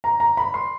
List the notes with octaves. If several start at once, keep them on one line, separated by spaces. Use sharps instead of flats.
A#5
A#5
B5
C6